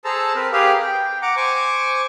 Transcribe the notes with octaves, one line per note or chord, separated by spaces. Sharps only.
G#4 A4 C5 A5 A#5 E6
C4 A#4 B4
G4 G#4 A#4 B4 F5
G5
F#5 A#5 D6
C5 G#5 C#6 D6